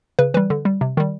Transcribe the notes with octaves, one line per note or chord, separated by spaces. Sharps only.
C#3 B4
E3 G3 B4
D3
G3
C3
D#3 G3